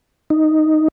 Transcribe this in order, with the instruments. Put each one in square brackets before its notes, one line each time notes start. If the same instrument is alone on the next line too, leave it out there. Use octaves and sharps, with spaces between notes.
[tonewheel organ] D#4